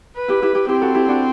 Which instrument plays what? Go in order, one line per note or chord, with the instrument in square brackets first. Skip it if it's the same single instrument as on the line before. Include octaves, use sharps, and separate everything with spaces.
[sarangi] B4
[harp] E4 G4
E4 G4
E4 G4
[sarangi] C4 [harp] E4 G4
[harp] F#4 A4
E4 G4
D4 F#4